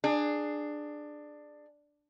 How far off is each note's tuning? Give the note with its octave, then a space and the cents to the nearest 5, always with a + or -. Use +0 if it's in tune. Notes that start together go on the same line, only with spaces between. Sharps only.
D4 +15 G#4 +0